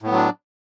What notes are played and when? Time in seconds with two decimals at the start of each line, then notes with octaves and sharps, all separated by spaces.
0.02 A2
0.07 B3
0.11 F#3
0.16 D4